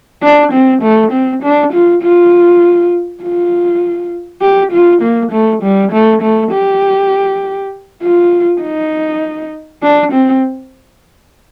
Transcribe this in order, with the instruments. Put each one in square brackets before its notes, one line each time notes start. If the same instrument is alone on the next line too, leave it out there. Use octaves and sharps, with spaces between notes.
[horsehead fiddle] D4
C4
A3
C4
D4
F4
F4
F4
G4
F4
A#3
A3
G3
A3
A3
G4
F4
D#4
D4
C4